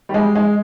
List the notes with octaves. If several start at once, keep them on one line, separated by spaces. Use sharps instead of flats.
G3
G#3
G#3